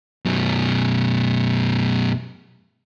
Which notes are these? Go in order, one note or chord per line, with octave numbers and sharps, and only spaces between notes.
F#2 B2